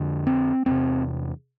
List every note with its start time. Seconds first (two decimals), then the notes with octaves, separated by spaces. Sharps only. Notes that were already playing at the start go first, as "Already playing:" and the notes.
Already playing: F2 D3
0.27 C4
0.66 E2 C3 C4